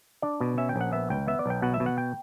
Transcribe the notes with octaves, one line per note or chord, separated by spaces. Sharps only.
D4 D5
B2
C#4 E5
G5
A#1 F#5
B3 E5
C#2 G5
B3 E5
D5
B1 G5
B2 F#5
E5
B2
F#5
G5